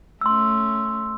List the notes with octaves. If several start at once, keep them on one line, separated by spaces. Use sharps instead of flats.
A3 C#4 C6 E6